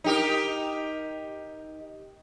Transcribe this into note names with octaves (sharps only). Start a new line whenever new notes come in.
D#4 G4 A#4